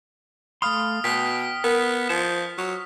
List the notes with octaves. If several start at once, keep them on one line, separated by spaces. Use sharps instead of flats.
A3 F5 B5 C6 D#6 F6
B2 G5 B6
B3 A#4
F3 E7
F#3